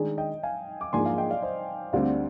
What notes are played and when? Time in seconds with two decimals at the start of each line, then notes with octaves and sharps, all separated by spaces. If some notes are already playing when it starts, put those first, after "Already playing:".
Already playing: D#3 G#3 D4 G#4
0.18 D#5 G5
0.43 F5 G#5
0.81 D6
0.93 G#2 F3 A#3 D4 G#4 G#5 C6
1.05 F5 G#5
1.18 D#5 G5
1.30 D5 F5
1.43 C5 D#5
1.93 D2 D3 G3 C4 D5 F5